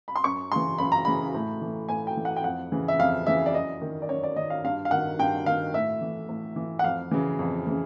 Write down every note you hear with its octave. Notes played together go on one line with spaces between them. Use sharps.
B5
C6
F#2 C#6
C#3 E3 C6
F#2 B5
A#5
C#3 E3 B5
A2
E3
A2 G#5
G5
E3
F#5
G5
F2 F#5
C#3 E3
E5
F2 F5
C#3 E3 E5
D5
F#2 D#5
D#3
D5
F#2 C#5
D5
D#3 D#5
F5
G2 F5
F5
D#3 F#5
G2 G5
D#3 F5
A2 E5
E3
A2
E3
F#5
F2 F5
C#3 E3
F2
C#3 E3